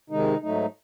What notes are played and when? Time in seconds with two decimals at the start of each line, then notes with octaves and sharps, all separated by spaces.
0.10 C3 D#3 G#3 D#4
0.41 G#2 F#3 A3 D#4